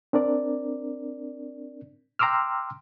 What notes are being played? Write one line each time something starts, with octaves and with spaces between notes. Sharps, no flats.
C4 D4 A#4 D5
G5 A#5 C6 D6 E6 F6